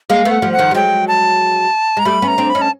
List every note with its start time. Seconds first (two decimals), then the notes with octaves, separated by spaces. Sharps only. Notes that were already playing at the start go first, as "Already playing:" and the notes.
0.10 G#3 A#3 F5
0.25 A3 B3
0.31 F#5
0.42 F3 G3
0.53 F#5
0.59 D#3 F3
0.71 G3
0.74 F#3 G#3 G5
1.08 A5
1.97 G#3 A#5
2.05 G3 A3 B5
2.22 B3 C#4
2.28 A#5
2.38 C4 D4
2.50 B5
2.55 C#4 D#4
2.62 A5